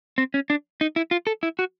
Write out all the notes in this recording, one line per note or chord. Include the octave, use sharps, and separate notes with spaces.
C4
C#4
D4
D#4
E4
F4
A4
E4
F#4